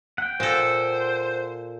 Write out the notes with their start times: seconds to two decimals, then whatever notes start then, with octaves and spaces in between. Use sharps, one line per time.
0.18 F#5 G5
0.40 A#2 A4 C5